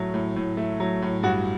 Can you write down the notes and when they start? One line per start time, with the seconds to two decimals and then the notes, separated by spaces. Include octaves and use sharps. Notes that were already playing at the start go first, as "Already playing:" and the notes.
Already playing: A2 F#3 A3
0.14 A2
0.36 A2
0.57 A3
0.80 F#3
1.02 A2
1.23 G2 F#4